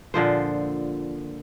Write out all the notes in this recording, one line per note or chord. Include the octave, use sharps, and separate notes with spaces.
A#2 D3 F3 C5